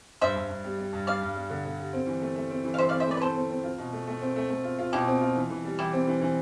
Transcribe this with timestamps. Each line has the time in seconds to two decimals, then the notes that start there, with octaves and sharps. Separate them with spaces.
0.21 G2 C5 E5
0.36 G2
0.49 G2
0.64 G3
0.78 G3
0.93 G2
1.07 G3 D5 F5
1.21 G2
1.36 G3
1.50 D3
1.64 D3
1.79 G3
1.93 C4
2.07 E3
2.22 A3
2.36 A3
2.50 C4
2.64 E3
2.74 F5
2.78 E3 C5 E5
2.89 D5 F5
2.92 C4
3.00 C5 E5
3.07 A3 B4 D5
3.17 B4
3.21 C4 A4 C5
3.36 C4
3.50 C4
3.64 F4
3.78 B2
3.93 A3
4.07 A3
4.21 C4
4.36 A3
4.50 A3
4.64 F4
4.79 F4
4.93 B2 E4 G4
5.07 C4
5.21 F4
5.36 E3
5.50 E3
5.64 G3
5.79 E3 E4 G4
5.93 C4
6.07 E3
6.21 E3